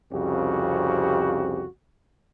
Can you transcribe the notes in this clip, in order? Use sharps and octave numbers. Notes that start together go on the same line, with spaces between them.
C2 F2 C#3 F#4 G4